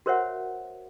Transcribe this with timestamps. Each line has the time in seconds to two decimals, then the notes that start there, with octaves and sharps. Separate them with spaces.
0.06 F#4 A#4 C5 C#5 E5 F#5